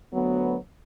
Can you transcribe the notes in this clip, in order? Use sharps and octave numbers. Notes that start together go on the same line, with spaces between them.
D2 F#3 B3